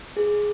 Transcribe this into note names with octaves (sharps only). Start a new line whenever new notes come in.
G#4